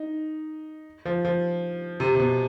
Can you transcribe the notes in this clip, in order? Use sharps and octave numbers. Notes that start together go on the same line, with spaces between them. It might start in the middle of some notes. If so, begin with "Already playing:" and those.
Already playing: D#4
F3
F3
C3
C3
B2